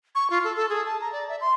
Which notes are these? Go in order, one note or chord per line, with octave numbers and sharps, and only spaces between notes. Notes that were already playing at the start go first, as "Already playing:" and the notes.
C#6
F4
A4
A4
G#4
A5
A#5
D5
E5
C6